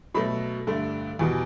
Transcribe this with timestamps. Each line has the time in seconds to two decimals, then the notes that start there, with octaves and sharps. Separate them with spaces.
0.14 B2 F#3 A3 B5
0.67 G2 D3 A3
1.19 E2 B2 G3